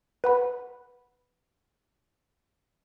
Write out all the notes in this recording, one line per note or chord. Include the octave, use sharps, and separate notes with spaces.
B4 F#5 B5